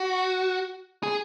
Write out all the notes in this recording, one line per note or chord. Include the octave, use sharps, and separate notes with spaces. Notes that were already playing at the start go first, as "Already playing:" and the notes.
Already playing: F#4
G#4